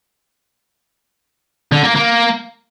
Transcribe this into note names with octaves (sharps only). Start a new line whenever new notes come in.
D3
A#3
A#3